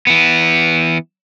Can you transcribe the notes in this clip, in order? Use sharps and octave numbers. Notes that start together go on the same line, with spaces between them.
E3 B3